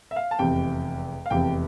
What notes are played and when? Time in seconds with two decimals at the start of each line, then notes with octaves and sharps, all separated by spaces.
0.11 E5
0.16 F5
0.31 A5
0.39 F1 E2 C3 G5
1.26 F5
1.30 F1 E2 C3 G5